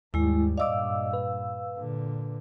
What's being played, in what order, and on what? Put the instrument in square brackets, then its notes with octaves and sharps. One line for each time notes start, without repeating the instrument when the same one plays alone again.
[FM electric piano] D#2 [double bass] G#2 G3 [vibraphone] G#3 E4
[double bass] G2 A#2 [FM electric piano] D5 D#5 D6 [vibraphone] F5 E6
[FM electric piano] B4
[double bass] A#2 D3